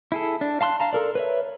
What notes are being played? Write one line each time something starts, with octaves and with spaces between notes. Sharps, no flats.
E4 G#4 A4
D4
F5 A5 C6 F6 F#6
F5 A5 A#5
A4 A#4 D5
B4 C#5 E5